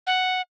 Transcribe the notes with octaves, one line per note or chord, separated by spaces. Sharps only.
F#5